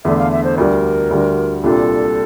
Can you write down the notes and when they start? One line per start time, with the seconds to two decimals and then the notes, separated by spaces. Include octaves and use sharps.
0.05 E2 D3 A3 E5
0.18 F5
0.32 E5
0.44 C5
0.58 D2 D3 G3 A#4
1.11 D2 D3 G3
1.63 C2 A#2 G3 D4 F4 A4